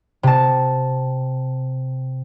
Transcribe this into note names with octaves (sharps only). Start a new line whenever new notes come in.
C3 A5